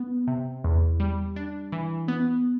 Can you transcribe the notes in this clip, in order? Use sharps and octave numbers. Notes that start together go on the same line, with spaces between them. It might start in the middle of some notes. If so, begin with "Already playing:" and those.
Already playing: B3
C3
E2
G3
D4
E3
B3